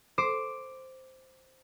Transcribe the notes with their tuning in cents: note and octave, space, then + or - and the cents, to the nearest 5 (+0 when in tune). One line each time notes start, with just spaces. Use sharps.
C5 +0 D6 +0